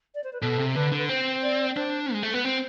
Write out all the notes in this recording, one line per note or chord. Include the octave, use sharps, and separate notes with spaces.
D5
C5
B4
B2 A4
C3
D3 B4
D3
B4
C4 C5
D5
D4 C5
G#3
A3
B3 B4
C4 C5